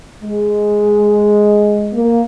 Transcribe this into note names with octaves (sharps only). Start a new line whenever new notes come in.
G#3
A#3